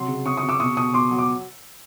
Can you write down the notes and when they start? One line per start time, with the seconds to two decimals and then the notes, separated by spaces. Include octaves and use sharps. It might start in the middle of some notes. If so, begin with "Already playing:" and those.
Already playing: C3 F#3 C6
0.08 C#3
0.26 C#3 C#6 D#6
0.37 C#6 D#6
0.43 C#3
0.49 D6 E6
0.60 B2 C#6 D#6
0.77 B2 C#6 D#6
0.94 B2 C6 D6
1.11 F#3
1.18 D6